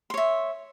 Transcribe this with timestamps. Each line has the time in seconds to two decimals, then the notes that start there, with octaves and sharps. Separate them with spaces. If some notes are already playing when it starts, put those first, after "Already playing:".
0.10 C6
0.14 C#5
0.17 E5